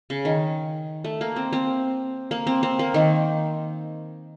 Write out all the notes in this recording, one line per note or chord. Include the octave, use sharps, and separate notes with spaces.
C#3
D#3
A3
A#3
C4
C4
A#3
C4
C4
A#3
D#3